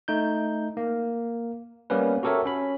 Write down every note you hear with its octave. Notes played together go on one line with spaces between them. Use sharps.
A3 D#4 G6
A#3
G3 A#3 B3 C#4 B4
F#4 G4 A4 A#4 C#5 E5
C#4 B5